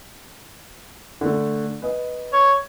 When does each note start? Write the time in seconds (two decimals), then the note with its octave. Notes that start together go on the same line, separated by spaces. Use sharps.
1.21 D3 A3
1.82 B4 D#5
2.33 C#5